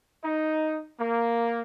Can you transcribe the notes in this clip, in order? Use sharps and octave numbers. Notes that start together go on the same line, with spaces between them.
D#4
A#3